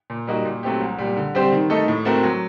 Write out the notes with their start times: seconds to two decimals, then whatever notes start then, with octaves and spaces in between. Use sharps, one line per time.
0.10 A#2
0.27 G3 A#3 D#4 F#4
0.45 A#2
0.63 F#3 A3 C4 G4
0.81 C2
0.98 A#2 G3
1.17 D3
1.35 G3 C4 G4 C5
1.52 D#3
1.70 A3 D#4 A4
1.88 A2
2.05 A3 C4 F#4 A#4
2.23 F#3